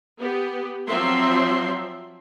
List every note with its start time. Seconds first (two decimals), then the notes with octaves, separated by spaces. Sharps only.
0.18 B3 G4
0.88 F3 F#3 C4 E5 C6